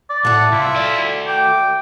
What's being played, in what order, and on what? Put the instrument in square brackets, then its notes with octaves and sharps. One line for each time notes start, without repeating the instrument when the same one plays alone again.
[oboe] D5
[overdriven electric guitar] A2 [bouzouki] A3 A4 [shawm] F#5
[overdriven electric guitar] C2 [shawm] E4 [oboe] F4
[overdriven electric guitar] F#4 D5
[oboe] G5 [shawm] D6